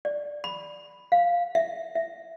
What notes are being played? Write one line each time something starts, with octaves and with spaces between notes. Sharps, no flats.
D5
B5
F5
E5
E5